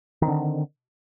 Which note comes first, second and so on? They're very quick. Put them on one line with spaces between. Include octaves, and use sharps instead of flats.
D#3 C4 D3